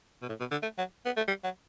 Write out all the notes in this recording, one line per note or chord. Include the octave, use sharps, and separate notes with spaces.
B2
A2
B2
D3
A3
F#3
B3
A3
G3
F#3